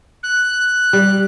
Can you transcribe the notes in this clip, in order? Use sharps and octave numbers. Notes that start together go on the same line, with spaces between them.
F#6
G3